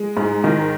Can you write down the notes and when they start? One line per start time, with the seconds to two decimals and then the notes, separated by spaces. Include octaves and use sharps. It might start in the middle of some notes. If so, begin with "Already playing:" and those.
Already playing: G#3
0.17 G#2
0.44 D#3